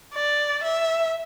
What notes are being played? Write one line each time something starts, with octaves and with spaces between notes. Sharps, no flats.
D5
E5